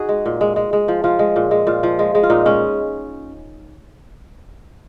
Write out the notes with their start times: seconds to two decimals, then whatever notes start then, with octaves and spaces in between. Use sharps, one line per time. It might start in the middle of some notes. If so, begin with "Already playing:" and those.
Already playing: D#4 F#4 G#4
0.09 G#3
0.26 A#2
0.41 G#3
0.56 G#3
0.73 G#3
0.88 F3
1.04 F3 F4
1.19 G#3
1.36 A#2
1.51 G#3
1.67 A#2 F4
1.83 F3
1.99 G#3
2.15 G#3
2.23 F4
2.30 A#2 D#4
2.46 G#3 C#4